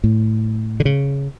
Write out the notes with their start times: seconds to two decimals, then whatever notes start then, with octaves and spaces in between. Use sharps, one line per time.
0.04 A2
0.80 D3
0.85 C#3